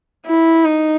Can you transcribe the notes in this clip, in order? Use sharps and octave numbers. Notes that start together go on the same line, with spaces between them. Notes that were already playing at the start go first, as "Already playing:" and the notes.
E4
D#4